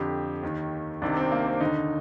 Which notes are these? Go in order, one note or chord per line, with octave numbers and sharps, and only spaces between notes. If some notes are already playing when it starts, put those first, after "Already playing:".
Already playing: F2 D3 G4
D#2 D#3
C2 C3 D#3 D4
C4
A#3
C4
D#2 D3 D#4